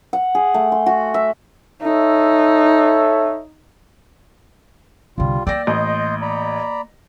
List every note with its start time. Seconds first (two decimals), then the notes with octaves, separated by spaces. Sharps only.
0.13 F#5
0.35 G#4
0.54 A3
0.72 C6
0.86 F#4
1.14 E5
1.82 D#4 A4 C#5 E5
5.18 C2 D3 G3 F4
5.47 A#3 D5 G5 E6 A#6
5.67 A1 D#5 C6 G6
6.22 D5 A#5 B5